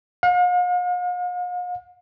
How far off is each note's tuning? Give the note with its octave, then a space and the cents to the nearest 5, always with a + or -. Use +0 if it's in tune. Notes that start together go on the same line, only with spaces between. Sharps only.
F5 +45